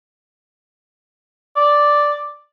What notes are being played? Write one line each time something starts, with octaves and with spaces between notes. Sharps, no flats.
D5